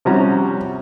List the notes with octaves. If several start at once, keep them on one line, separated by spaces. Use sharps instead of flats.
C3 F3 G3 C#4 F#4 A#5